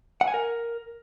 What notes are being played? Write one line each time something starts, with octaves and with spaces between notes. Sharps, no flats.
F#5
G#5
A#4